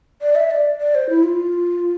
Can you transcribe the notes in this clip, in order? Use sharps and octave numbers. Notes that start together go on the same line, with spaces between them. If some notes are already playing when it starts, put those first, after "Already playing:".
D5
E5
D5
D5
C5
E4
F4